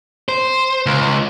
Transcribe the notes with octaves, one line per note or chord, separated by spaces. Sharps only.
C5
C#2